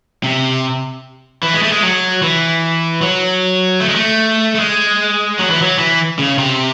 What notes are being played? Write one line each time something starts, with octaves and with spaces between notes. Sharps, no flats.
C3
E3
G#3
A3
G#3
F#3
E3
F#3
A3
G#3
A3
A3
G#3
F#3
E3
F#3
E3
C#3
C3